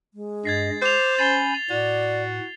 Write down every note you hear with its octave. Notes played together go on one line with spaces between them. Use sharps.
G#3
G2 D#5 G#6 A6 C7
C5 D6 C7 F7
C#4 G#5 B5 G6 A6 C7 G7
A2 F#4 D5